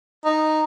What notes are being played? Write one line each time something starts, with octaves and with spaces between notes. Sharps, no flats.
D#4